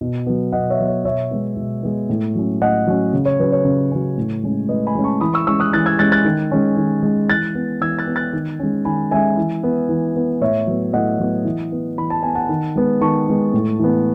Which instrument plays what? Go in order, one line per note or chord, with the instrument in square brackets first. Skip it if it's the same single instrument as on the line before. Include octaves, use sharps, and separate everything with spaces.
[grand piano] B2
F#3 B3
B2 D#5 F#5
C#5 E5
F#3 B3
C#5
B2 C#5 E5
G#3 B3
B2
G#3 B3
A2
F#3 C#4
A2 D#5 F#5
F#3 C#4
C#3
C#5
F#3 C#4 B4
C#5
C#3
F#3 C#4
A2
G#3 C#4
A2 B4 D#5
G#5 B5
G#3 C#4
A5 C#6
E3 B5 D#6
C#6 E6
G#3 C#4 C#6 E6
D#6 F#6
E3 F#6 A6
E6 G#6
G#3 C#4 F#6 A6
F#6 A6
D#3
G#3 C#4
D#3
G#3 C#4
E3 F#6 A6
B3
E3 E6 G#6
F#6 A6
B3
F#6 A6
D#3
G#3 C#4
D#3 G#5 B5
G#3 C#4 E5 G#5
E3
B3
E3
B3
A2 C#5 E5
F#3 B3
A2 D#5 F#5
F#3 B3
E3
B3
E3 B5
A5
B3 G#5
F#5 A5
D#3
G#3 B3
D#3 A5 C#6
G#3 B3
A2
E3 B3